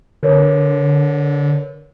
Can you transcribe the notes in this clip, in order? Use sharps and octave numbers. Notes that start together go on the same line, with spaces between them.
D3 A#4 B4 C#5